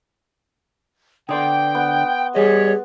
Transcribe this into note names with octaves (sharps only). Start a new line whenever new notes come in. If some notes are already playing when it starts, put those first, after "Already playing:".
D3 B3 D5 G5 C6 D#6
B3
G3 G#4 C#5 D#5